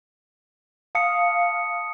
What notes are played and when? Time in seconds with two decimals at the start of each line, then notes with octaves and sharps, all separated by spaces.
0.95 F5 A5 D#6 C#7